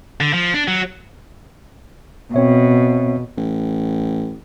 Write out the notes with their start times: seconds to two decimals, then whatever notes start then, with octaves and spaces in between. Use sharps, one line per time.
0.21 D3
0.33 F3
0.54 D4
0.68 F#3
2.34 B2 C4 C#5 E5
3.37 A1